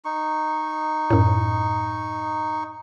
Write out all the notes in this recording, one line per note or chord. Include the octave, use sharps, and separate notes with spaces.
D#4 C#6
F#2 A2